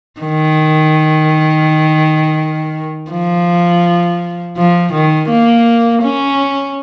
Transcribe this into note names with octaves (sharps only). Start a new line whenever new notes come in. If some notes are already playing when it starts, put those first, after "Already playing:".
D#3
F3
F3
D#3
A#3
C#4